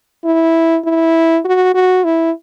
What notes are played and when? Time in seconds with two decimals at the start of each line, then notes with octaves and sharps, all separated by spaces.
0.25 E4
0.85 E4
1.45 F#4
1.74 F#4
2.04 E4